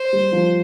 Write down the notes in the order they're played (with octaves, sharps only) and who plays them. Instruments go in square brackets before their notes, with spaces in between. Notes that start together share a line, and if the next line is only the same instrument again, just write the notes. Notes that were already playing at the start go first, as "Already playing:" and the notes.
Already playing: [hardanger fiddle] C5
[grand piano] G3
F3